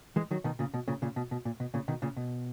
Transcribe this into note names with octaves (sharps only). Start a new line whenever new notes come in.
E3 G#3
D#3 F#3
B2 D#3
A#2 C#3
B2
A#2 C#3
A#2 C#3
B2
B2
A#2
B2
A#2 C#3
B2 D#3
A#2 C#3
B2